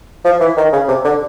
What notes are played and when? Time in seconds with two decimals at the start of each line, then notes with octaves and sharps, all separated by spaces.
0.25 F3
0.40 E3
0.57 D#3
0.73 C#3
0.88 C3
1.04 D3